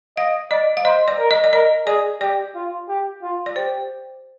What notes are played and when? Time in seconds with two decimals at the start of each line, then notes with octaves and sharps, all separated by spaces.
0.17 D#5 F5
0.51 D5 D#5
0.77 F5
0.85 C5 D#5
1.08 D5
1.19 A#4
1.31 D#5
1.44 D5
1.53 A#4 D#5
1.87 G#4 D5
2.21 G4 D5
2.55 F4
2.88 G4
3.22 F4
3.46 D5
3.56 G4 C5